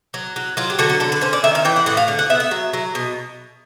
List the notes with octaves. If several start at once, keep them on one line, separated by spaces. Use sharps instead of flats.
F#3
F#3
F#3 F4
G4
D3 F#4
F#4
D3 A4
B4
C#4 C5
D5
D#3 E5
F5
E3 G5
F#5
A2 F#5
F5
D3 F5
F#5
B3 E5
E5
F#3
F#3
B2